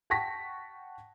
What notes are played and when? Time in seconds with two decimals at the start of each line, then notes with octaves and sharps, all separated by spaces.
0.10 F#5 G5 A5 C#6 A#6 B6